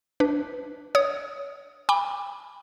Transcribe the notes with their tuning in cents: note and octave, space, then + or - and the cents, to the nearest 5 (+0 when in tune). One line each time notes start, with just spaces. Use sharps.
D4 +0 B4 +0
C#5 +20 D#6 +5
G5 +45 B5 +0 D6 +0